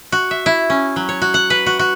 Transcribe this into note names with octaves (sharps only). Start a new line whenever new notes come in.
F#4
E5
E4
C#4
F#3
C#5
F#4
F#5
B4
F#4
F#4